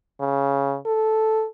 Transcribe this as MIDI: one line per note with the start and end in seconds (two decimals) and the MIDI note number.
0.20 0.77 49
0.86 1.46 69